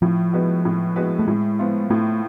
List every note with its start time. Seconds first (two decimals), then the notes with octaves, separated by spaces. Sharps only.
0.02 A2 F3
0.33 G#3 B3 F#4 B4
0.65 A2
0.96 G#3 B3 F#4 B4
1.19 A3
1.28 A2 G#3
1.59 F3 B3 F4
1.90 A2 A3